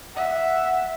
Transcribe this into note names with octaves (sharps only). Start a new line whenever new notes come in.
E5 F#5